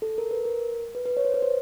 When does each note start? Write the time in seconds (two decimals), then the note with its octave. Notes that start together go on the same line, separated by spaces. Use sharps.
0.02 A4
0.18 A#4
0.31 B4
0.45 A#4
0.95 B4
1.06 B4
1.17 C#5
1.25 C5
1.34 B4
1.42 C5